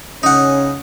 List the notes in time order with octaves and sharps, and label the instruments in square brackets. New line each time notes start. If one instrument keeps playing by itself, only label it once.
[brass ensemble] C#3 C#4 [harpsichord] D#4 F#5